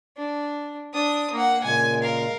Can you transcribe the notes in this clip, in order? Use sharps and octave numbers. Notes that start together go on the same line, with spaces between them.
D4
D4 D#6
A#3 A#4 F#5 A#5
A#2 C#3 G#3 G#5
A#4 F5